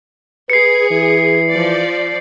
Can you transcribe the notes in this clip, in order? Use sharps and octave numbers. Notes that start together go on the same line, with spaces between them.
G#4 B4 C7 C#7
E3
F3 D5